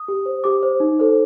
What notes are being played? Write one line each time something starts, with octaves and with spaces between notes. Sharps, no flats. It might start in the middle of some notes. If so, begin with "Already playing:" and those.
Already playing: D#6
G4
C5
G4 D6
C5
D#4
A4 C5